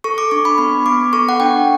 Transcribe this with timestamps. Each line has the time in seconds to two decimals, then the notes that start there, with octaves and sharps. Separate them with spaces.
0.04 A4 C#6
0.18 D6
0.31 D4 C#6
0.45 B5
0.58 B3 B5
0.86 B3 D6
1.13 A4 C#6
1.29 F#5
1.40 D4 G5